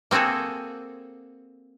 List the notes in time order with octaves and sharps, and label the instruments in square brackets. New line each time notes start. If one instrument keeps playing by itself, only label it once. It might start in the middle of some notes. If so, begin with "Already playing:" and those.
[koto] A#3 C4 F#4 G#4 A4